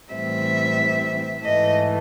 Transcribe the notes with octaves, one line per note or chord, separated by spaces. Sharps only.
A2 E3 G3 C4 E5
G#2 E3 A3 D#5